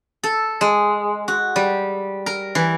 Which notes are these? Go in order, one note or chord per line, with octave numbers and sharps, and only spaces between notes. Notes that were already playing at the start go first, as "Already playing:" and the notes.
A4
G#3
F#4
G3
A#4
E3